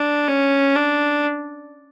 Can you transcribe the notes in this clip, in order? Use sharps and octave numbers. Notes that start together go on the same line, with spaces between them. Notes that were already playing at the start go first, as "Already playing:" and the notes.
Already playing: D4
C#4
D4